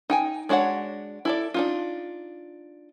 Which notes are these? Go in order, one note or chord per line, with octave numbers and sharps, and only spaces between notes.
D#4 G5 G#5
G#3 D4 F#4 C#5 F#5
E4 A4 D5
D4 D#4 F4